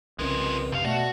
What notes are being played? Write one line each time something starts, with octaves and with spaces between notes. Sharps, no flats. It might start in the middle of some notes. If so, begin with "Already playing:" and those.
C2 C#3 F3 G#3 C4 C#4 A#4 B4
C2 F#2 C3 F5
B2 A3 F#4 D5